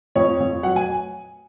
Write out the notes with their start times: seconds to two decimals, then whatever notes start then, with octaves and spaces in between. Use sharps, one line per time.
0.15 F2 C#5
0.40 F2
0.63 F#3 F#5
0.76 G#5